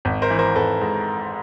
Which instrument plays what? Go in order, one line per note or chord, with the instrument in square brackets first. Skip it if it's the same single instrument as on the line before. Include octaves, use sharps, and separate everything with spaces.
[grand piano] G#1
A#4 C5
E3
A#4 C5
G#1 A4 B4
G#2